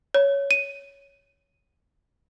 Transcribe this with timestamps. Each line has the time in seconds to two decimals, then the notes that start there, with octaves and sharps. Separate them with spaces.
0.14 C#5
0.51 D#7